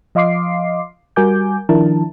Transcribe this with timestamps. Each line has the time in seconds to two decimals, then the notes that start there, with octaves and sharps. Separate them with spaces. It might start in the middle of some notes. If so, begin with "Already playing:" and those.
0.15 F3 D#5 F5 C6 D6 C7
1.16 G3 F#4 A#4 G#5 D6 G6
1.69 D#3 F3 D4 E4 A#4 A5